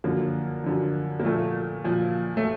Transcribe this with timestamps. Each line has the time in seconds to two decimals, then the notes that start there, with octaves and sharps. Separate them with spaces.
0.04 F#2 D3 F3 A#3
0.64 F#2 D3 F3
1.20 A#3
1.24 A#2 F3 A3
1.84 A#2 F3
2.37 A3